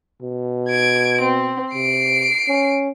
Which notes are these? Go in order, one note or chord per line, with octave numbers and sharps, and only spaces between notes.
B2
G#6 D7
C4
C3 C7 D7
C#4